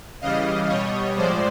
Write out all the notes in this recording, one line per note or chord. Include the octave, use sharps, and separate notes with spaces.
C#3 E3 G3 D#5 F5
B2 G3 C#5 D#5
A2 F3 G#3 C5 D5